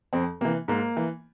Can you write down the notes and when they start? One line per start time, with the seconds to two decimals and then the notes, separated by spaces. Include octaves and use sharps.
0.13 F2 C4
0.41 C3 A#3
0.45 E3
0.68 G#2 A#3
0.97 E3